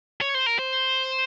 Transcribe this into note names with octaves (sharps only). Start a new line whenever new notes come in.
C#5
C5
A#4
C5